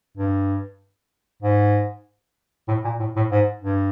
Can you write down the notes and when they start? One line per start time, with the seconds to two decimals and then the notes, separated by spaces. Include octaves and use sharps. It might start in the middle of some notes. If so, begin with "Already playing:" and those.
0.17 G2
1.42 G#2
2.68 A2
2.84 A#2
3.00 A2
3.16 A2
3.31 G#2
3.62 G2